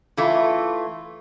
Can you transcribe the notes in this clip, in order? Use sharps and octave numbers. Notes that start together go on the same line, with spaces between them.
E3 A3 F4